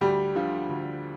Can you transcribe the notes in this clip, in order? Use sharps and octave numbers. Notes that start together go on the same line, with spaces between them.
D2 G3 G4
D3 F3
D2